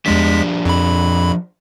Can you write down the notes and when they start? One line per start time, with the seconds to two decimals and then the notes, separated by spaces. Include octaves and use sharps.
0.06 E2 F3 G#3 D4 G4 B6
0.65 F2 B5